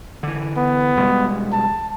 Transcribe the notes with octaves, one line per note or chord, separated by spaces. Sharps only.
D3 E3
B3
E1 G3 G#3
A5